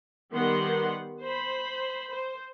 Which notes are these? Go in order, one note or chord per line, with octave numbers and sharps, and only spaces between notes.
D#3 G3 B3 G4 F#5 C6
C5 B5
C5